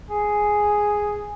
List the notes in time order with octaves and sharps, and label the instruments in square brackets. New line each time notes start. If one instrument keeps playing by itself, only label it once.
[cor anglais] G#4